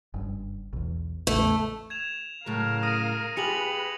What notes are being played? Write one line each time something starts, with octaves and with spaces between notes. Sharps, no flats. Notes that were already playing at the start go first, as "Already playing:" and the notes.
F#1 G2
B1 E2
A1 E2 C#3 A3
G#6 E7 F7
A2 C#3 F#3 A#4 F5
D#6 A#6 D#7
F4 G4 G#4 B4 C#7 F7 F#7